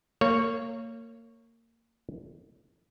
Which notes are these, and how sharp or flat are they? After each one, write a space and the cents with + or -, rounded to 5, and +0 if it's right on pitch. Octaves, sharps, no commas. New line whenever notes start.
A#3 -25 C#5 +0